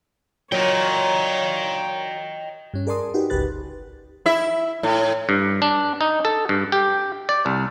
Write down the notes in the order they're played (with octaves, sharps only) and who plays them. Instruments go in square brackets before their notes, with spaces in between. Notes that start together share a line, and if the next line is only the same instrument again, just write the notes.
[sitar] A#2 [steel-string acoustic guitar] F#3 [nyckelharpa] C#5 [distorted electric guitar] D#5 G5
[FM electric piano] G2 C#4
G#4 A#4 D5 A5 C6 D#6
D#4 F#4 G4 B4
G1 C#2 G4 B4 F#6 A6
[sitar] E4 E5
A2
[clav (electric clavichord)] G2
D4
D#4
A4
G2
G4
D5
C2